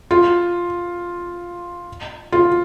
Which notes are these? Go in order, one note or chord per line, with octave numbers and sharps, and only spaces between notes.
F4
F4